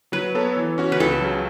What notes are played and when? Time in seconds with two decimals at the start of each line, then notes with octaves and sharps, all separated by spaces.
0.12 F#3 B4
0.35 B3 A4 C#5
0.57 E3
0.78 C#4 F#4
0.92 B4
1.00 C#2 A4
1.21 C#3 F#3